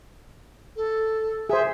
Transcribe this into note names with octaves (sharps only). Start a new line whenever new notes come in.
A4
G#4 C5 E5